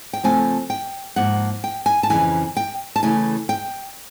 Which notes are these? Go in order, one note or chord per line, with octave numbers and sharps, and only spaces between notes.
G5
C#3 F3 A3 C4 G#5
G5
G#2 F3 A#3 F#5
G5
G#5
A5
F2 C#3 E3 G#5
G5
A5
C#3 E3 A3 G#5
G5